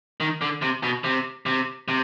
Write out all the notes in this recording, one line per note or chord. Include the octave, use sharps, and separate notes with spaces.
D#3
D3
C3
B2
C3
C3
C3